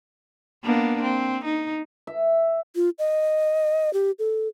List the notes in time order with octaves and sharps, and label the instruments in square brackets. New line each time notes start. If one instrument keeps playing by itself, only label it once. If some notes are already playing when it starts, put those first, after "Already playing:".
[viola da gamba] A#3 B3 D4
C4
D#4
[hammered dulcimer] E5
[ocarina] F4
D#5
G4
A4